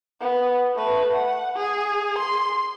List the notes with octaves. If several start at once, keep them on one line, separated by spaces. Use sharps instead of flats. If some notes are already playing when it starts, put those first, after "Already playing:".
B3
A3 B4
F#5
G#4
C6